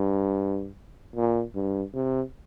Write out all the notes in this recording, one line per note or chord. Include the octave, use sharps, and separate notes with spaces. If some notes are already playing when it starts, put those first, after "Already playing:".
Already playing: G2
A#2
G2
C3